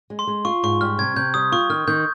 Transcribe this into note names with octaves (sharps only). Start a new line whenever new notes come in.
G#3
C6
G#3
F4 C#6
G#2 C#6
G3 F6
C3 G#6
C3 G6
G3 D#6
F4 C#6
D#3 F6
D#3 G6